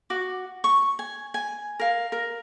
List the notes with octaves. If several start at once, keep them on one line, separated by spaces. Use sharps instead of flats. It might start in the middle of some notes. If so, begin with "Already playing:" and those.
F#4 D6
C#6
G#5
G#5
A#4 F5
A#4